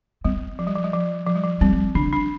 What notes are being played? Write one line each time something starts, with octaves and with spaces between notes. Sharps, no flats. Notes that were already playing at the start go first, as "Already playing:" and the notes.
G3 C4
F3
G3
F3
G3
F3
F3
G3
F3
G3 C4
D3 D4
D4